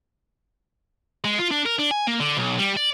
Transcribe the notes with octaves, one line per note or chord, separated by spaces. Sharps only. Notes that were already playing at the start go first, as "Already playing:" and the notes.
G#3
F4
D4
A#4
D4
G#5
A#3
D3
B1
G3
D5